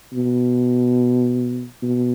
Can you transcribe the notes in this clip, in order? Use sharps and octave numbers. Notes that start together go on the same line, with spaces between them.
B2
B2